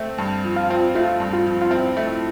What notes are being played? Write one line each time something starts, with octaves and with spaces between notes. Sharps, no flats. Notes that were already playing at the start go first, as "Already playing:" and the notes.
Already playing: A3 C4
G2
F3
F4
C4
A3 F4
G2
F4
F3
F4
C4 E4
A3